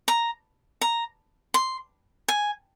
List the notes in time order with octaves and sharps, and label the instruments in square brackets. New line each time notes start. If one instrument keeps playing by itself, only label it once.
[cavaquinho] A#5
A#5
C6
G#5